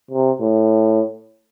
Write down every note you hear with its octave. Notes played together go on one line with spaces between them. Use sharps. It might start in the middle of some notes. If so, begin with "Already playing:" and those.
C3
A2